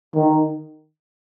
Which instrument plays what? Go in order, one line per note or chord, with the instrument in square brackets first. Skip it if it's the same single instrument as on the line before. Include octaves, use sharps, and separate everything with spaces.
[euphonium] D#3